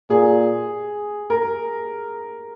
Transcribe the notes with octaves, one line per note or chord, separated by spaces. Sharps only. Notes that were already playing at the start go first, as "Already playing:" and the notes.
A#2 G#4
A#4